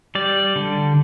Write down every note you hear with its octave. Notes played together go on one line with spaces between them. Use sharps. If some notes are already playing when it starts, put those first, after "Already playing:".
G3 D5
D3